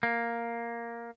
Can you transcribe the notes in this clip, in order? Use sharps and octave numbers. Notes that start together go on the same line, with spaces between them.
A#3